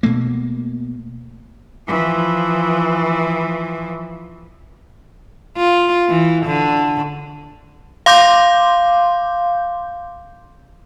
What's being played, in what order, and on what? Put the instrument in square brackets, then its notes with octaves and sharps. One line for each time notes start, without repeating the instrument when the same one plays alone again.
[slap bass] B2 A3 A#3
[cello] E3 F3
[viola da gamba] F4
E3
D3
[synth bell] F5 C6 D6 G6